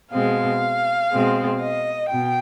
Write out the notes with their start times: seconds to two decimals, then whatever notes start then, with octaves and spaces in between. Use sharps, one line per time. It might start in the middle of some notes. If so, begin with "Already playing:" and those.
0.12 B2 G#3 C4 F5
1.12 B2 G#3 C4
1.61 D#5
2.10 B2 G5